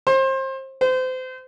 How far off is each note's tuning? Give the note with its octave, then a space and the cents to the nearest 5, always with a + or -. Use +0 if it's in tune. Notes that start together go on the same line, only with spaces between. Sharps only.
C5 +30
C5 -30